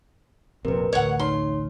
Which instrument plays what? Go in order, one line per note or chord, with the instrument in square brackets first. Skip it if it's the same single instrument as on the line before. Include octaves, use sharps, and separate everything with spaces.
[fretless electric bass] F1 A#1 C3 [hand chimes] A#4 B4
[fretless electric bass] A1 D2 [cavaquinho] C#5 F#5
[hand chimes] D#4 C#5 [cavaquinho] C6